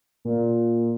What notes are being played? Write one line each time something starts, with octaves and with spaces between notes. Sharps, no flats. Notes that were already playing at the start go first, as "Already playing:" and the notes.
A#2